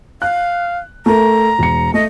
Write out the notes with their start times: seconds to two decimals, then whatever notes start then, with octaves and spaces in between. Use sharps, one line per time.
0.22 F5 F#6
1.06 A3 A4 A#4 A#5
1.59 E1 C#7
1.94 A3 D#5